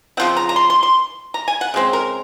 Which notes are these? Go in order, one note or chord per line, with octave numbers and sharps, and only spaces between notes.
C#3 F3 C4 F#5
A#5
A#5
C6
C6
C6
A#5
G#5
F#5
C#3 G#3 C4
A#4